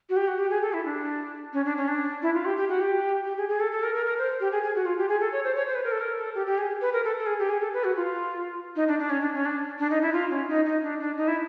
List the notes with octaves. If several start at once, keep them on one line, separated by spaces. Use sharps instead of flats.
F#4
G4
F#4
G4
G#4
A4
E4
D4
C#4
D4
C#4
D4
E4
F4
G4
G4
F#4
G4
G4
G#4
G#4
A4
A4
A#4
A#4
A#4
C5
G4
G#4
G#4
F#4
F4
G4
G#4
A4
C#5
C5
C#5
C5
B4
A#4
A4
A#4
A4
G4
G4
G#4
B4
A#4
A4
A4
G#4
G4
G#4
A4
B4
F#4
F4
D#4
D4
D4
C#4
D4
C#4
D4
D4
D#4
E4
F4
C#4
D#4
D#4
D4
D4
D#4
E4